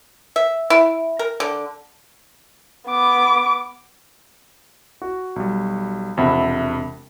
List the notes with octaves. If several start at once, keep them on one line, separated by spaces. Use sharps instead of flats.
E5
E4
A#4
D3
B3 D6
F#4
B1 G3
E1 F2 C3 E5 F#5 B5